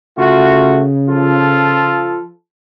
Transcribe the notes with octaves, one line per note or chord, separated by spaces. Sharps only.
C#3 A3 F4 F#4
F3 F4 A4